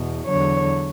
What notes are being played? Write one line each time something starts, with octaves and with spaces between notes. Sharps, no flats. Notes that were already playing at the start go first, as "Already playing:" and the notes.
Already playing: E2 B2
E2 D3 F#3 C#5